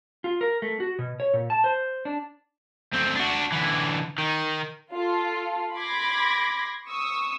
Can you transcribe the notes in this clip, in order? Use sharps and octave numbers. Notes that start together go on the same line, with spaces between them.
F4
A#4
A3
F#4
B2
C#5
A#2
A5
C5
D4
D2 C4
D4 F#4
D3 E3
D#3
F4 A4
B5 C6 D6 G#6 A#6
C#6 D#6 E6